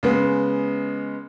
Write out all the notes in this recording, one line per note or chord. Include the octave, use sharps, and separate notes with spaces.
C#3 G#3 B3